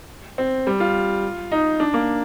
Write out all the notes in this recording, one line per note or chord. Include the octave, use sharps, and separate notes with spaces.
C4
G3
F4
D#4
D4
A#3